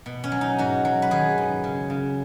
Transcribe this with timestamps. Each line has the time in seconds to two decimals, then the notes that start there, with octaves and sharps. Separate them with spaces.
0.06 B2
0.24 C#4
0.32 F#3
0.41 D#4
0.58 G#2 F#4
0.85 F#3
1.02 B4
1.11 D#3 G#4
1.38 F#2
1.64 C#3
1.90 C#3